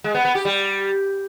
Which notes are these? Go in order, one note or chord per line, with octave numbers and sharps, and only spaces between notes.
G#3
B3
B3
G4
G3